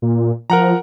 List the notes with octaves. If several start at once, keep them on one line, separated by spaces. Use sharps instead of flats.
A#2
F3 A#4 F#5 A#5